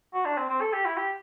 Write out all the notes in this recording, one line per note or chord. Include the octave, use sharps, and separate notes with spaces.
F#4
D4
C4
C4
A4
G4
E4
G4